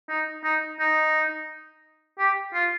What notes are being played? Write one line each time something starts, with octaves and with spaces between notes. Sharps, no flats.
D#4
D#4
D#4
G4
F4